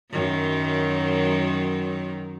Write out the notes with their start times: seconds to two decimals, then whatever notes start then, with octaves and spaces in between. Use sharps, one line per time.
0.11 F#2 D#3 F#3